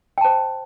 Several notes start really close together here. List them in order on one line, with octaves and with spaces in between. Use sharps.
G5 A5 C5